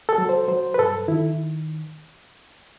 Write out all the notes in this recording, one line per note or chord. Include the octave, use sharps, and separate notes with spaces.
A4
F#3
C5
F#3 C5
B4
G2 A4
D#3 E4